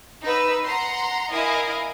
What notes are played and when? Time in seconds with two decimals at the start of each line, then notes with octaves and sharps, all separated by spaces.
0.22 D#4 B4 E6
0.65 F#5 A#5 C6
1.31 E4 A#4 D#5 F5 G#5